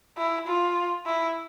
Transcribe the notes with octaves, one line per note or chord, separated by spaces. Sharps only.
E4
F4
E4